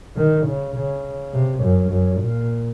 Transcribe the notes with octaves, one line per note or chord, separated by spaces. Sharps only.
D#3
C#3
C#3
C3
F#2
F#2
A#2